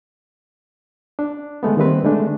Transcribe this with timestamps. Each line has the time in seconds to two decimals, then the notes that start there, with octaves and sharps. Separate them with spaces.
1.19 D4
1.63 D3 G#3 A3 B3
1.77 D#3 G3 A#3 C4 B4
2.04 D3 G#3 A3 D4